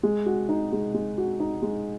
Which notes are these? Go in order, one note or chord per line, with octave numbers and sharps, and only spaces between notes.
G#3
F#4
D#4
G#3
G#3
F#4
D#4
G#3